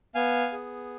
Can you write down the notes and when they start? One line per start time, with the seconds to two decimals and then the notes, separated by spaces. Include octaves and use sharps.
0.15 B3 F5 G#5
0.52 G#4